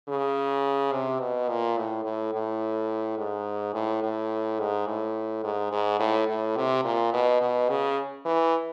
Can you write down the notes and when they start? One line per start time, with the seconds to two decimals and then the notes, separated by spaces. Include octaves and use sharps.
0.08 C#3
0.93 C3
1.20 B2
1.49 A#2
1.77 A2
2.04 A2
2.34 A2
3.18 G#2
3.74 A2
4.03 A2
4.59 G#2
4.87 A2
5.44 G#2
5.72 G#2
5.99 A2
6.28 A2
6.57 C3
6.85 A#2
7.13 B2
7.41 B2
7.69 C#3
8.25 E3